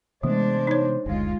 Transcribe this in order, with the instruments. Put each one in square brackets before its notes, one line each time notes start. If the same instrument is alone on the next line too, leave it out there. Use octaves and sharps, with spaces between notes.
[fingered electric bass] C3 E3 B3 [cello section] G#3 D4 [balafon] A3 [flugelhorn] C5
[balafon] D#4 C#5
[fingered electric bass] F#1 D2 [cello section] G#3 F4